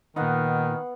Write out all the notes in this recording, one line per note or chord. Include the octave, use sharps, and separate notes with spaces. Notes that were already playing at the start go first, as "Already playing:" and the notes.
A#2 D#3 B3 D#4 F5 F#5